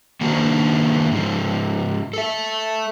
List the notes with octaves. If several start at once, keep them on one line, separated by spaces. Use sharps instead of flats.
D#3 A#3 B3 D4 F#4 C5
G#2 F3
A4 E5